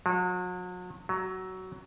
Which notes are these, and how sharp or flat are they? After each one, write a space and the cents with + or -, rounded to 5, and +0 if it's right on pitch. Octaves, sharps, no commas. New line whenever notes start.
F#3 -40
F#3 +15